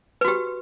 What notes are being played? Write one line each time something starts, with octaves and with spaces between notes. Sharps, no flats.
F#4 G4 B4